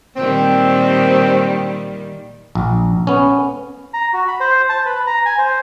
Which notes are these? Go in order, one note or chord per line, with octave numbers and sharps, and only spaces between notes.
A#2 D#3 G3 C4
A#1
B3 C#4
A#5
F#4
B5
C5
A5
B4
A#5
G#5
C5